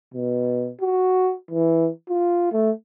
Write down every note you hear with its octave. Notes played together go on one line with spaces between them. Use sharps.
B2
F#4
E3
F4
A3